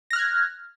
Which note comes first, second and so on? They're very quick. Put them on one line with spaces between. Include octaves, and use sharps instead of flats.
A#6 F6 F#6 G#6